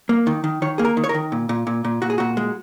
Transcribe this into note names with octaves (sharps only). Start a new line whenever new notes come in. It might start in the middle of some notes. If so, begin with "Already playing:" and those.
A#3
D#3
D#3
D#3 C#5
A#3 G#4
A#4
D#3
C#5
A#4
D#3
A#2
A#2
A#2
A#2
A#2 F#4
G#4
A#2 F#4
G#3